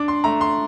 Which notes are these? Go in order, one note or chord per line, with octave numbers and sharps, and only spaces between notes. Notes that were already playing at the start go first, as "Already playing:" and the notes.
Already playing: D4 D6
C6
A3 A#5
C6